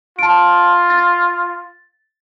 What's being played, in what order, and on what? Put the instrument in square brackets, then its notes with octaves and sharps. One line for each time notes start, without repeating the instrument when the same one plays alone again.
[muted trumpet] F4 [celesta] A5 D7
[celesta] A6